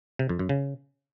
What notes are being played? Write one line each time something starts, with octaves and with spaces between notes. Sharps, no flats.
C3
F2
F#2
C#3